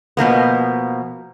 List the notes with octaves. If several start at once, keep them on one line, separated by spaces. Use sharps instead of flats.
B2 F3 A#3 B3